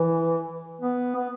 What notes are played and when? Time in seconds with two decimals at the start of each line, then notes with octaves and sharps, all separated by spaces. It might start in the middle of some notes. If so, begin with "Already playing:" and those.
Already playing: E3
0.82 B3
1.16 B3